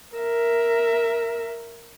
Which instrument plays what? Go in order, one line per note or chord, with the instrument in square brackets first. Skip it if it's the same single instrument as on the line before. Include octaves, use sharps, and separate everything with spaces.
[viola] A#4 E5